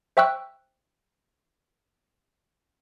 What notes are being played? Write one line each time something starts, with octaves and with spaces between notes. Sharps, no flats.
C5 E5 G5 C#6 E6 F#6